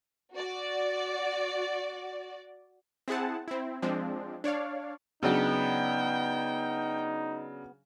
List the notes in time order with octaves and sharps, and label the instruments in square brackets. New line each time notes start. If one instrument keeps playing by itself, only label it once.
[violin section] F#4 D5
[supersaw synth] C4 E4 G#4 F#5 A5
C4 E4
F3 G#3 C4 D4
D4 C#5 D5 F5
[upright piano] C#3 F#3 D4 [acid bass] B3 [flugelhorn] D#4 [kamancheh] G5